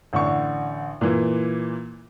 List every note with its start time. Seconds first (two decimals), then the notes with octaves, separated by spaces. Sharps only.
0.13 A1 D3 C#6
1.01 A#2 E3